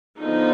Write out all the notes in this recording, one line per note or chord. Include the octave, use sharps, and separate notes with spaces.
D3 F3 B3 D#4